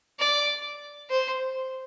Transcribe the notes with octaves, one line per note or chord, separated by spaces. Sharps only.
D5
C5